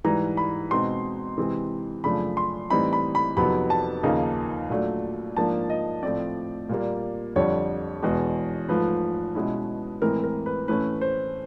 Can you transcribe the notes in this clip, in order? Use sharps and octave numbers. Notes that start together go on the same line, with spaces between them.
G#2 E3 G3 A#5
B5
B2 G#3 C4 D#4 C6
C3 E3 G#3 C4
F#2 C#3 F3 A3 D4 B5
C6
A2 E3 G3 C4 D#4 B5
B5
B5
F2 C3 D#3 F#3 B3 B5
A5
D#2 C#3 F3 A#3 D#4
A#2 F#3 A3 D4
G#2 F3 A#3 D4 A5
D#5
A2 F3 A3 C4 D5
A#2 G3 A#3
F2 D3 G3 C#5
E2 B2 G#3
G#2 F3 A3 B4
B2 G#3 C#4 E4
A2 E3 G#3 C4 E4 A#4
A#4
B4
A2 E3 A3 C#4 B4
C5